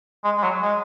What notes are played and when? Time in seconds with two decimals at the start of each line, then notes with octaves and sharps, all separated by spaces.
0.24 G#3
0.37 G#3
0.44 F#3
0.62 G#3